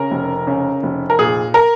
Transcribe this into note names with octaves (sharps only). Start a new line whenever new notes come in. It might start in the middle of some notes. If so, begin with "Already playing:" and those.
Already playing: C#3 A#4
F1
C#3
F1
A#4
A#2 G#4
A#4